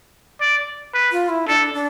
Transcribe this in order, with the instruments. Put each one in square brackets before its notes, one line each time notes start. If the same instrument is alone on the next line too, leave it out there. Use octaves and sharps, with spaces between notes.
[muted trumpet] D5
B4
[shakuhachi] F4
E4
[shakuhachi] D4 [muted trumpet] A4
[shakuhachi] D4